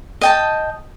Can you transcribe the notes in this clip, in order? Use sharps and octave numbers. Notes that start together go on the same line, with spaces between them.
D#5 G5 A5